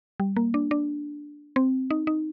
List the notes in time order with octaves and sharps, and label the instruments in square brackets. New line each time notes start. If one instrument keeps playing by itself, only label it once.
[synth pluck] G3
A#3
D4
D4
C4
D#4
D#4